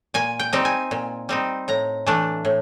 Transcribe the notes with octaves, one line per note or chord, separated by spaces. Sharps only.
A#2 G#5
G5
G3 C4 D#4
G#5
A#2
G3 C4 D#4
A2 A#5
E3 A3 D4
A2